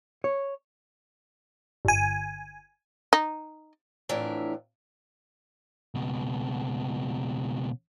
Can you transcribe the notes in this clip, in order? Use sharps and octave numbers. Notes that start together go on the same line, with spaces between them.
C#5
G1 G#5
D#4
F2 A2 E3 D4 A#4 E5
C#2 B2